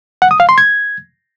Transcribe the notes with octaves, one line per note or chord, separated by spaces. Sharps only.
F#5
D#6
F5
C6
G#6